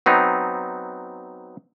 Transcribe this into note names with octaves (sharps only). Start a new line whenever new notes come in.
F#3 B3 C4 D#4